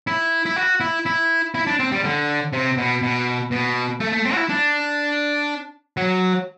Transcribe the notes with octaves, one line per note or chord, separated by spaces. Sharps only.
E4
E4
F#4
E4
E4
E4
D4
C4
G3
D3
C3
B2
B2
B2
A3
A3
C4
F#4
E4
D4
F#3